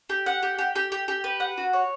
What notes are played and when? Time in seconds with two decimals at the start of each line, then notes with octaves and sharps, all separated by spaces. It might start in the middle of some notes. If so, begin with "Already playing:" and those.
0.10 G4
0.26 F#5
0.43 G4
0.58 G4
0.75 G4
0.92 G4
1.08 G4
1.24 B4
1.40 F#5
1.58 F#4
1.73 C#5